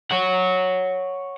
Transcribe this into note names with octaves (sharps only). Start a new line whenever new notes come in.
C#5 F#5